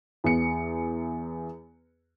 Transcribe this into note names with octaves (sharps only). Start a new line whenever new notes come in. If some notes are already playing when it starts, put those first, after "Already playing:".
E2 C#7